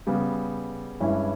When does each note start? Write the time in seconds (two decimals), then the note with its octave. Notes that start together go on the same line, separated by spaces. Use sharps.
0.07 C#3 G3 B3
1.00 G2 E3 G#3 C#4 E4